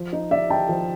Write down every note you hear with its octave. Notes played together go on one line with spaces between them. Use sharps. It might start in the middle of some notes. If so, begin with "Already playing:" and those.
Already playing: F3
D#4
D#4 D5 E5
D#4 G5 A5
F3